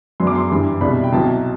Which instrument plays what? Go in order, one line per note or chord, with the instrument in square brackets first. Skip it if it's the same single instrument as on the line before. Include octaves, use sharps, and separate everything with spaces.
[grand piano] F#2 F#3 B3 D4 C6
D6
C6
G2 E3 G3
C2 B2 G3 D4 B5
G5
C2 B2 F#3 A5